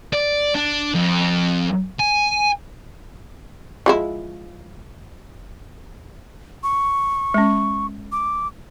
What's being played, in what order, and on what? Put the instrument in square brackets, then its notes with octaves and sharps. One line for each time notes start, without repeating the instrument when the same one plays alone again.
[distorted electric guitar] D5
D4
F2
G#5
[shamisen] F3 G#3 E4
[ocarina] C#6
[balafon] G#3 C#4
[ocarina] D6